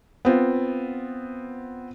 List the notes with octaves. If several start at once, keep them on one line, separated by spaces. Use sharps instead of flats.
B3 C4 F4